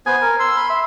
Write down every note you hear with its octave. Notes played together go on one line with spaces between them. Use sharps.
B3 B4 C5 G#5
A#4
C6 E6
B5
E5